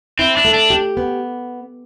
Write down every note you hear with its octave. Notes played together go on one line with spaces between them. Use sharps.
C4 E4
D4
A3
D4
G4
B3